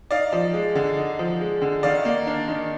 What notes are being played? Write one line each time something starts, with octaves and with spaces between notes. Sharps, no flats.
D#4 D5 F5
F3
G#3
D3
D#4
F3
G#3
D3
D#3 D5 F5
A#3
D4
D#3